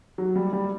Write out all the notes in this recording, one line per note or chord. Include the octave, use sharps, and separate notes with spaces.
F#3
G3
G3